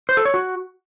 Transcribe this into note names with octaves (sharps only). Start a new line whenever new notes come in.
C5
A4
C#5
F#4